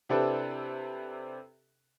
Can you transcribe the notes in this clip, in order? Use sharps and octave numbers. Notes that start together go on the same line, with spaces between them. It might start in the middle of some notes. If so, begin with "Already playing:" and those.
C3 C4 D4 E4 A4 B4